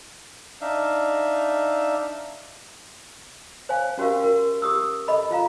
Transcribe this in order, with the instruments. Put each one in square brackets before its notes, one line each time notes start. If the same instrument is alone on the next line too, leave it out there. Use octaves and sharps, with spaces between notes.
[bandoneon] D4 D#4 E5 F5
[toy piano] C5 C#5 F5 G#5
C#4 F#4 G4 A#4 F5
F#4 A#4
G4 D#6 E6
A4 D#5 B5
F4 F5 A#5